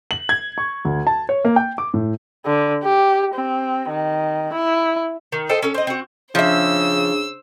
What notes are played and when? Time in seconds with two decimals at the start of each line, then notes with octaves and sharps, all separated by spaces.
0.11 F#7
0.29 G#6
0.58 C#6
0.85 D2
1.07 A5
1.29 C#5
1.45 A#3
1.56 G5
1.78 D6
1.94 A2
2.45 D3
2.83 G4
3.34 C4
3.90 D#3
4.53 E4
5.32 D#3
5.49 A4 C5 D#5 G5
5.62 C#4 A4
5.74 C4 D#5
5.87 C4 E4 F#4
6.35 C#3 F3 D4 G#4 C5 E5 E6